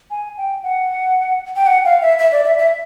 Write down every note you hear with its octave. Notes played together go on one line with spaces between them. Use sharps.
G#5
G5
F#5
G5
F#5
F5
E5
E5
D5
E5
E5